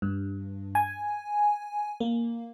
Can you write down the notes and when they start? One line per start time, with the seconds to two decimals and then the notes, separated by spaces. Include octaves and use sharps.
0.02 G2
0.75 G#5
2.00 A#3